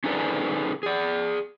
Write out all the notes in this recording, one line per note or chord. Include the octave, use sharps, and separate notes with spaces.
C#4 D#4 G#4 A4 B4 D5
G#4 D5